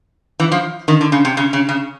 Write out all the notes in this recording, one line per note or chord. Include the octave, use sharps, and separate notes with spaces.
E3
F3
D#3
D3
C#3
C3
C#3
C#3
C#3